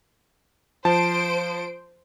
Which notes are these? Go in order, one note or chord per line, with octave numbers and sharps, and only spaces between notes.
F3 C5 A5 D7